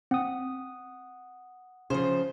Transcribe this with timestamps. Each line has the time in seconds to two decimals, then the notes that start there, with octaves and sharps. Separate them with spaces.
0.11 C4 F#5 D#6
1.90 C#3 F3 C5